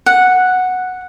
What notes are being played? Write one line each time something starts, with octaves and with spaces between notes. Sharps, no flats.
F#5